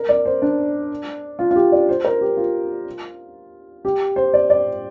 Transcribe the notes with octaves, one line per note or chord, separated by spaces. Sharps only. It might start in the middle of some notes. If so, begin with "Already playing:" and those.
Already playing: A#4
D5
C5
D4
F4
F4
G4
D5
C5
A#4
G4
F4
G4
C5
D5
D5